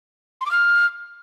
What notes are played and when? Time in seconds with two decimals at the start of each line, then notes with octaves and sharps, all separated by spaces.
0.41 C6
0.46 D6
0.51 F6